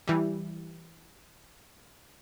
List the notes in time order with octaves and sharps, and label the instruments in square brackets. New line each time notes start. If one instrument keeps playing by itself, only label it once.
[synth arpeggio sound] E3 G3